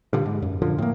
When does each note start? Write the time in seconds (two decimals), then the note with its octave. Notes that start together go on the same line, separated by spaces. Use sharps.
0.13 G2 A#2 D3
0.26 G#2
0.42 F#2
0.62 F#2 A#2 D3 F3
0.78 A2 A#3